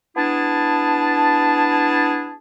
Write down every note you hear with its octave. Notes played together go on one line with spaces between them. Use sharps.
B3 D4 E4 G#4 A5